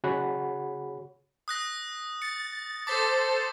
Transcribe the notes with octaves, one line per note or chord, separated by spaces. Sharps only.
C#3 F#4 G#4 C#5 F#5 B5
D#6 F#6 A#6
A6 C#7
A4 C5 A5 D6 A6 B6